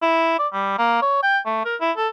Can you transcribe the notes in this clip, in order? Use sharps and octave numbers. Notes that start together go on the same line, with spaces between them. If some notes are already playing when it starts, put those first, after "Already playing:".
E4
D5
G3
A#3
C#5
G5
A3
A#4
E4
A4